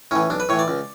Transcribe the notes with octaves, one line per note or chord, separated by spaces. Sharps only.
A2 E3 C#4
B1 D4
B4
A2 E3 C#5
D5
C#2